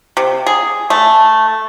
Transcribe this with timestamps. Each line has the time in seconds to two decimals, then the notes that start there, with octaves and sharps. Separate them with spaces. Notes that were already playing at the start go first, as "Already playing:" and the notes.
0.17 C3
0.47 G#4
0.90 A3